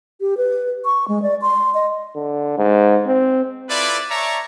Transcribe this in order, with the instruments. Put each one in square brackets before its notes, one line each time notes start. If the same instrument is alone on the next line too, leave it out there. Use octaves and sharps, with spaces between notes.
[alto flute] G4
B4
C#6
G#3
D5
C6
D#5
[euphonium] D3
G#2
C4
[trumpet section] E4 F4 A4 B4 D5
C#5 D5 E5 A5 A#5 C#6